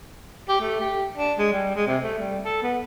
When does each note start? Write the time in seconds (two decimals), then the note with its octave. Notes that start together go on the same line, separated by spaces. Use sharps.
0.49 G4
0.60 A3
0.80 G4
1.17 D4
1.38 G#3
1.52 G3
1.75 G#3
1.87 C3
2.02 A3
2.19 G3
2.44 A4
2.63 B3